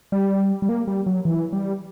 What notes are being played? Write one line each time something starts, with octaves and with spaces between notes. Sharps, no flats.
G3
G3
A#3
G3
F#3
E3
G3